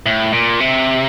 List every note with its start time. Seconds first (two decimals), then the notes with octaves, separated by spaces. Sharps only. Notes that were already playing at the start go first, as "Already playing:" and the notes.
0.06 A2
0.33 A#2
0.60 C3